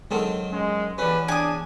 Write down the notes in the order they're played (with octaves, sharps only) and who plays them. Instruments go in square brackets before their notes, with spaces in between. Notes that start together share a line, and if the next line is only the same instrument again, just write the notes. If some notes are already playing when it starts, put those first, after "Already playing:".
[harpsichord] D#3 F#3 C4 [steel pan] G#3 A4
[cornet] G#3 [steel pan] C#4
[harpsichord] E2 C#4 [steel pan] G4 D5 [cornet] B4
[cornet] D4 [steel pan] G5 [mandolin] G#5 D#6